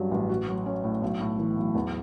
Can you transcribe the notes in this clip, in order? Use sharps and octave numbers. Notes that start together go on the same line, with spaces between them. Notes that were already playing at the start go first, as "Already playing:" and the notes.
Already playing: G2 F#3 C#4
A1
F#4
F#3
C#4
A2
B1
A2
E3
B1
E2